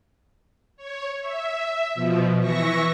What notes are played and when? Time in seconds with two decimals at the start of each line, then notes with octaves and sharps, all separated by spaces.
0.77 C#5
1.21 E5
1.95 B2 F3
2.39 E3 E5 C#6 A#6